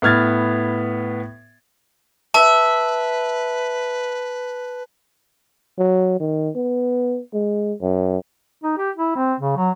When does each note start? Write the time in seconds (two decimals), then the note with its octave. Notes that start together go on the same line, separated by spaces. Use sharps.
0.02 A2 B3 F6 G#6 A6
2.34 B4 E5 A5
5.78 F#3
6.20 D#3
6.56 B3
7.34 G#3
7.82 F#2
8.64 D#4
8.78 G4
8.96 E4
9.16 C4
9.40 C#3
9.58 F#3